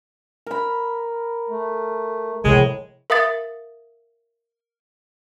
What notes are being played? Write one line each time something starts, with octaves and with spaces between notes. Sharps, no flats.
A#4 B5
A3
A2 C3 F3 G#3
A#4 E5 F5 D#6 A6